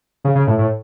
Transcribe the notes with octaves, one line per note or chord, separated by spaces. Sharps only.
C#3
C#3
A2
A2